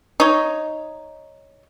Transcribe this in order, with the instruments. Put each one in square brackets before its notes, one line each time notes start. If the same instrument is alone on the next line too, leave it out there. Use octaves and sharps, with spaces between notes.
[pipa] D#4 C#5